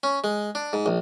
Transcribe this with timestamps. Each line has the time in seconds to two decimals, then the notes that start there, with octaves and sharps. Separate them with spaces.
0.03 C#4
0.24 G#3
0.55 D4
0.73 G#2
0.86 A#1